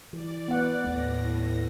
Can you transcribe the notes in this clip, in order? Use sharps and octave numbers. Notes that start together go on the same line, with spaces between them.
E3 D5
B3 F#5
D#2 A2 A3 A#6